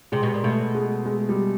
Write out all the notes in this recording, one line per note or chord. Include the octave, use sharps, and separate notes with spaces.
C3 G#3
B2
A#2
B2 A3
G#3
G#3
G3